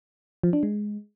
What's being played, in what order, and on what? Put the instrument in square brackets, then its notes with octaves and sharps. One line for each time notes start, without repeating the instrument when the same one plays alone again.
[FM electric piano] F3
D4
G#3